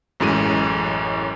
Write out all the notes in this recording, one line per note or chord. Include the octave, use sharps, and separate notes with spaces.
A1 F#2 A2 G#3 D#7